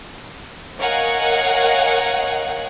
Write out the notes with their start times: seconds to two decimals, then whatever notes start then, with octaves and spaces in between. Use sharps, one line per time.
0.79 A#4 C#5 D#5 F5 F#5 G#5